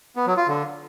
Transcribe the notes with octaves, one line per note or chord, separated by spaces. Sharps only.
B3
F#3
F4
D3